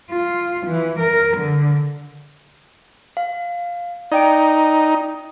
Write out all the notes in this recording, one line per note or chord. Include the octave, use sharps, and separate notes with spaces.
F4
E3
A#4
D3
F5
D#4 D5 G5 D7